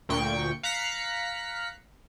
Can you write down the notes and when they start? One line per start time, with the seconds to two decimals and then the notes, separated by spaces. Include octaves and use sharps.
0.09 D2 A#2 G5 C#6
0.63 F5 A#5 F#6 B6 C#7